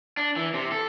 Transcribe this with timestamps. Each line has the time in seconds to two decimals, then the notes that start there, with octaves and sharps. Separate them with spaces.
0.17 D4
0.37 E3
0.54 C3
0.72 A4